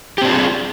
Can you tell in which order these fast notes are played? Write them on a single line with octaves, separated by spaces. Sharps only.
G4 C4 D4 F4 G#4